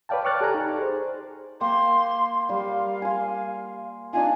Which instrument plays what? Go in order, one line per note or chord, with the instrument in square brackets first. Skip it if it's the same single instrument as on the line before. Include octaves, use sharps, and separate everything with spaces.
[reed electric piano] B4 C#5 D5 F5 G5 A5
G5 C#6 D6 F6 F#6 A6
G4 A4 D5 G#5 A#5
D#4
G#4 C5
[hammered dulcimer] A#3 G5 [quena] C6
[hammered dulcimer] G3 [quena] F5
[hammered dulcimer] G#5 C6
[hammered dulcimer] D4 D#4 F4 [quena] G#5